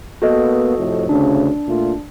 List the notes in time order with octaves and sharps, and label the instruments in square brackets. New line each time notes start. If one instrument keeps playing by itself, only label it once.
[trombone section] A#3 B3 [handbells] F#4 A4 D#5
[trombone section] F2 A2 C3
[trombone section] D2 C#3 [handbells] D4
[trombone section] A#2 A3 F4